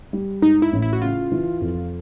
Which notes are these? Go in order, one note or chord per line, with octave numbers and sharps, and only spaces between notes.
G3
G#2 D#4
E4
A1
E4
F#4
C#3 F4
E3
F2